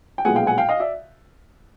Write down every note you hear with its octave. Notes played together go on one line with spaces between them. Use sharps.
G5
B1 A#2 F3 G#3 B3 F#5 G#5
F5 G5
F#5 G#5
F5 G5
D#5 F5
D5 E5